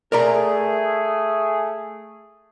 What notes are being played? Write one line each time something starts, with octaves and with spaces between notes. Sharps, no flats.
A3 G#4 A#4 D5 A#5